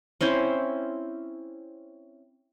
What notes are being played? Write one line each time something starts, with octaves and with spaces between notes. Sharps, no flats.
C4 C#4 E4 C5